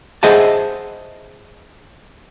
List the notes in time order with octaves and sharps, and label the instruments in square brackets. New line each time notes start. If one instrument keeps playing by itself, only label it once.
[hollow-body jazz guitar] G#4 C5 D#5 E5 F#5 A5